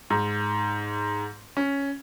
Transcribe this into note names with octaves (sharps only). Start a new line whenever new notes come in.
G#2
C#4